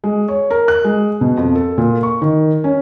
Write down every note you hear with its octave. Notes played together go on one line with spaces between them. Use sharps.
G#3
C#5
A#4
F#6
G#3
B2
F2
A4
A#2
C#6
D#3
C#4